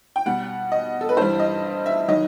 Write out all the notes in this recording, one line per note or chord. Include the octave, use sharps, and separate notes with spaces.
G5
B2 G3 F#5
D#5
A4
B4
G2 E3 G3 C5
D#5
E5
D#3 F#3 D#5